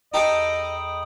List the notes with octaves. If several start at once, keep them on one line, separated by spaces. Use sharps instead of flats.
E2 D#4 G4 A4 D#5 B5 D#6